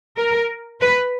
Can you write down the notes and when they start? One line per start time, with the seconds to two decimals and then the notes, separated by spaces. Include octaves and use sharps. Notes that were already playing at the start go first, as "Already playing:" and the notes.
0.17 A#4
0.81 B4